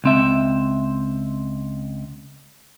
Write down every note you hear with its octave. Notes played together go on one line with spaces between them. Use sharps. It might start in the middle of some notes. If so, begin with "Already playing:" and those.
C#2 C4 E5